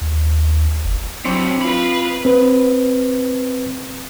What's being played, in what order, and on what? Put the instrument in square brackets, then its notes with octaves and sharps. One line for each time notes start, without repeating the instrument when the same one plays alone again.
[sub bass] D#2
F#1
[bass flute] F#3 [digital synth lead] C4 [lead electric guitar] D4 C#5 [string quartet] E4 G4 D#5
[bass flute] F4 [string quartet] B4 D#5 F5 [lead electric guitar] B5
[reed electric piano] C4 B4